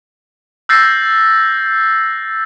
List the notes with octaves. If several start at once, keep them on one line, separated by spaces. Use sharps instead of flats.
E6 F#6 G6 A6 A#6 C7